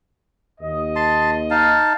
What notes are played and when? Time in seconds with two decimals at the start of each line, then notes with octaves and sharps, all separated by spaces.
0.61 D#2 D#5
0.96 A5 C6
1.50 D#4 F5 A5